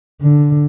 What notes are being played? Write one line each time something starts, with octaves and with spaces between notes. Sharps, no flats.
D3